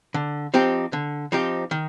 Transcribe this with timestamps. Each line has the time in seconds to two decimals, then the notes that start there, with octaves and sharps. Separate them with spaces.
0.14 D3
0.54 F3 C4 D#4 G4
0.93 D3
1.32 F3 C4 D#4 G4
1.71 D#3